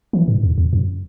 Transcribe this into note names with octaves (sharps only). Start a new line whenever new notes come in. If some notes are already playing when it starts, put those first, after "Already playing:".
E3
G#2
E2
E2
F#2